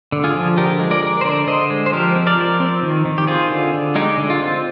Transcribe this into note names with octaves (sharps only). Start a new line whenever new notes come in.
D3
F4 G#4
F3
D3 G4 A#4
G#3
A#4 D5
G#3
C5
D3 A#4 D5
D3 C5 D#5
G#3
C5
F3 G4 A#4
C4
A#4 D5
F3
C4
D#3
D#3
G4
C4 F4 G#4
D3
D3
G#3 D#4 G4
D3
F4
C4